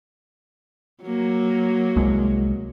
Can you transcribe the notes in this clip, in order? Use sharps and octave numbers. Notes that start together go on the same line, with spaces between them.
F#3 A#3
C2 G#3